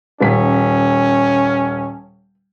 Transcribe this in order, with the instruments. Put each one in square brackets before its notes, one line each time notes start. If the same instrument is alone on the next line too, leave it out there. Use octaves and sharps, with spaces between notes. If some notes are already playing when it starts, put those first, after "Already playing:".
[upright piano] D#1 B6 [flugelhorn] C#4